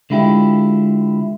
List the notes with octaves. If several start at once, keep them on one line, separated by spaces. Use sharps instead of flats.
D3 G#3 E4 F4 G4